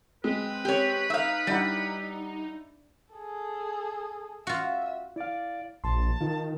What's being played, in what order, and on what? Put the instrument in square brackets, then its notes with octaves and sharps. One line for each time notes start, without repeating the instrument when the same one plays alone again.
[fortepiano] G#3 [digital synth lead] C4 [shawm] B4
[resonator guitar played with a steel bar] G4 C#5
[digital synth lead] D#4 [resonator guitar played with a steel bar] E5 F5
[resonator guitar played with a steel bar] G3 [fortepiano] D4 E4 F#5
[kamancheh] G#4 A4
[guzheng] F4 F#4 [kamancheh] E5
[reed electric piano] E4 F5 [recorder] D5
[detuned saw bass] A#1 [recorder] A5 [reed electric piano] C6
[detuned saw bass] D#3 [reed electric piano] F4 A#4